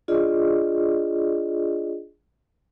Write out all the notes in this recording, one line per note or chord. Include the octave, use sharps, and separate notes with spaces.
D4 F4 G#4 D5 D#5